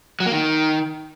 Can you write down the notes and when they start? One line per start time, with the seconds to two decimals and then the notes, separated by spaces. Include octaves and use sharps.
0.20 F#3
0.26 A#3
0.32 D#3